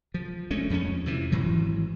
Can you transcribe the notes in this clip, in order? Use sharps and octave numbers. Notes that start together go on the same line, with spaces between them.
F3
D2 G#3 A3 C#4
F2 F3 F#3 C#4
F2 C3 E3
G#1 G#2 E3 F#3